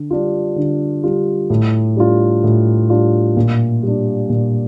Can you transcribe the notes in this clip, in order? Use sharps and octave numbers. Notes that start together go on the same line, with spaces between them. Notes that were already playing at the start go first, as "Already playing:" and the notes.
Already playing: D3
G3 D4 F4
D3
G3 D4 F4
A2
G3 D4 F4
A2
G3 D4 F4
A#2
G3 D4
A#2